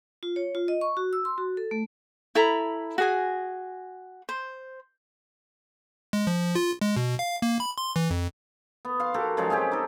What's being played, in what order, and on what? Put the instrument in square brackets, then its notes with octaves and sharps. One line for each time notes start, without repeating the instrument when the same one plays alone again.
[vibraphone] F4
C#5
F4
D#5
C#6
F#4
E6
C6
F#4
A4
A3
[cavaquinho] E4 A4 A#5 B5
F#4 G#4 G#5
C5
[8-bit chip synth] G#3
F3
F4
G#3
B2
F5
A#3
B5
C6
E3
F2
[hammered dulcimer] B3
F5 C6
F#4 G4 A4 A#4
C#3 F3 F#3 G#3
G#3 C4 C#4 G4
D#4 A4